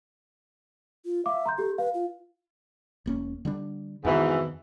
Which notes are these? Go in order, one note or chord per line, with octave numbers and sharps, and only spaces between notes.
F4
E5 F5 D6
A#5 C6 G6
G4 A4
B4 F5
F4
E1 A#3 C#4
D3 G3 D4
F2 G#2 B2 D#3 E3